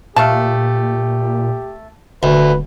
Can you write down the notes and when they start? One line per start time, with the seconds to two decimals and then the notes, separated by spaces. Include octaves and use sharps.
0.16 A#2 A3 G4 F5 A5
2.23 D#1 D2 B4